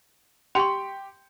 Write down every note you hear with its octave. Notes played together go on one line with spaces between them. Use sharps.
G4 G5 C6 C#6 C#7